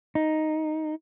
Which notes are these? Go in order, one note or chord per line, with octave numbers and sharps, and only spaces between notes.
D#4